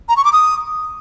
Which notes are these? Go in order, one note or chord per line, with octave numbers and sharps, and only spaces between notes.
A#5
C#6
D6
D#6